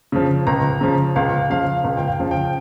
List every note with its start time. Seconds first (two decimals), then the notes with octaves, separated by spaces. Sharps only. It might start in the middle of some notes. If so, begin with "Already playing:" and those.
0.12 C#3 F3
0.47 C#2 A#5
0.81 C#3 F3
1.16 C#2 F5
1.50 C#3 F3 F5
1.84 C#2
1.97 G5
2.08 F5
2.20 C#3 F3
2.31 G5